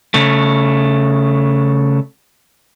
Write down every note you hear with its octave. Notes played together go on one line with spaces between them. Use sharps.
C#3 A3